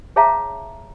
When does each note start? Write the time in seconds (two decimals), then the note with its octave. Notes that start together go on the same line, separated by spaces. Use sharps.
0.16 G#4 C#5 E5 F5 A5 A#5